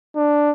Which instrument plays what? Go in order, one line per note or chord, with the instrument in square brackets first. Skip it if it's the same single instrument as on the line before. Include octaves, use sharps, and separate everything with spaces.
[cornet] D4